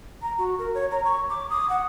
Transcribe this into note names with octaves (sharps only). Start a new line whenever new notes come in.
A#5
F#4
A#4
C#5
A#5
C#6
D6
D#6
F#5